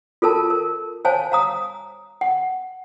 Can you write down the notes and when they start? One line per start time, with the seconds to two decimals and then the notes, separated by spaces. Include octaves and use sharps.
0.22 F4 A4 A#4 A5
0.50 A#4
1.05 C5 C#5 F5 G#5 A5
1.32 F5 A#5 D#6
2.21 F#5